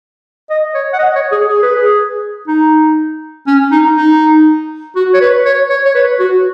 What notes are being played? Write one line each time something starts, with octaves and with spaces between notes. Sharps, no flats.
D#5
C#5
F#5
D#5
C#5
G#4
G#4
B4
G#4
D#4
C#4
D#4
D#4
F#4
C#5
B4
C#5
C#5
C#5
B4
F#4